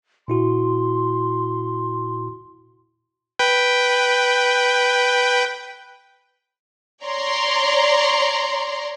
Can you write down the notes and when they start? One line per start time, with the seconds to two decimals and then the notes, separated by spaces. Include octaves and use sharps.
0.28 A#2 E4 F#4 C6
3.39 B4 G5
7.03 C#5 D5 A#5 C6